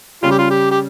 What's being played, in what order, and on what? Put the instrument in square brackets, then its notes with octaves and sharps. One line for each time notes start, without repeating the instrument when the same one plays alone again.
[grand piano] C#3 G3 C#4 [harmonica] F4
[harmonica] G4
F4
G4
G4